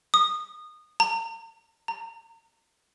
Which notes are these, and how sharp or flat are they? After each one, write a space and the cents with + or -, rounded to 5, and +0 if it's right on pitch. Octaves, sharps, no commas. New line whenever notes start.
D#6 -20
A#5 -40
A#5 -35